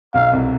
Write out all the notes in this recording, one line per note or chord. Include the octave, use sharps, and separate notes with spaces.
B1 B2 F5
C2 C3